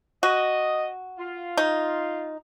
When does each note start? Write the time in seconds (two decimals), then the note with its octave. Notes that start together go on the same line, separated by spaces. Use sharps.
0.23 F#4 D#5
1.19 F4
1.57 D#4